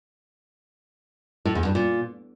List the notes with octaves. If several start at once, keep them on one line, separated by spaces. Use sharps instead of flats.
A2
E2
G2
A#2